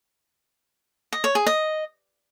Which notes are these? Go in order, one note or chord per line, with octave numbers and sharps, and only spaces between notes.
D#5
C#5
G#4
D#5